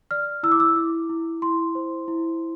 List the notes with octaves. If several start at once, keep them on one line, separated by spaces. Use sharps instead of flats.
D5 F6
E4 E6
D6
E6
E4 D6
E4
E4 C6
C5
E4